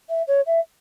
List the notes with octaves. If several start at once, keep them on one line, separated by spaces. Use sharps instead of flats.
E5
C#5
E5